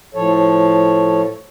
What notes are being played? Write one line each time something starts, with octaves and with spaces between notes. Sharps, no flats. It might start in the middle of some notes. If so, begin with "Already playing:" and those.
A2 F3 A4 C#5